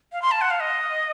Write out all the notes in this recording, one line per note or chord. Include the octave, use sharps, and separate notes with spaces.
F5
C6
A5
F#5
F5
D#5